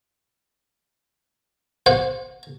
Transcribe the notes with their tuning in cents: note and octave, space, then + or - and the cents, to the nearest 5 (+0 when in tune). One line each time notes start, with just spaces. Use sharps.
C5 +0 F#5 -25